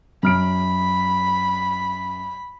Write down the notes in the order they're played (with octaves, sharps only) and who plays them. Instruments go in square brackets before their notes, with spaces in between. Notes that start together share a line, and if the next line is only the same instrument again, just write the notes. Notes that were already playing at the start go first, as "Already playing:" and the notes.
[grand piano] F#2 F6 D7 [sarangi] B5